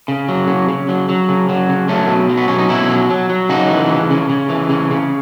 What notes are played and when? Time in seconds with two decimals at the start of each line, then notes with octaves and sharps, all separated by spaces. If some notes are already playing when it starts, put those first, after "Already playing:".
0.08 C#3
0.29 F#3
0.48 C#3
0.69 C#3
0.89 F#3
1.09 F#3
1.29 C#3
1.49 F#3
1.69 C#3
1.88 F#3 A3 C#4
2.09 B2
2.30 F#3
2.37 B3
2.48 B2 C#4
2.59 D#4
2.69 B2 C#4 E4
2.89 F#3
3.10 F#3
3.30 F#3
3.49 C#3 D#4 F#4
3.70 E3
3.89 C#3
4.11 C#3
4.30 C#3
4.49 E3
4.70 C#3
4.91 C#3